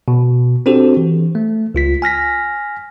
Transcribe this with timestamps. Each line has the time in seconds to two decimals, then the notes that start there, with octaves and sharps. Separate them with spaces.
0.08 B2
0.66 C4 D4 F#4 G4 A4 C5
0.97 E3
1.35 A3
1.75 C#2 F4 B6
2.02 G#5 F6 A#6 B6